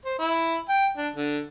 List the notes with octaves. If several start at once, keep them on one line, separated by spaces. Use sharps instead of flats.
C5
E4
G5
D4
D3